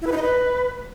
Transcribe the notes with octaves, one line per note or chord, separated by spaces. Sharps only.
E4
B4
D#4
D#5
B4